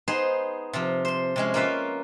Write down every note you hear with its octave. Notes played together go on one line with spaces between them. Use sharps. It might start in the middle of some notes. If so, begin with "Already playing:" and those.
B3 D#4 G#4 C5
C3 F3
C5 C6
C3 G#3 C#4
A#3 C#4 F4 B4 E5 F5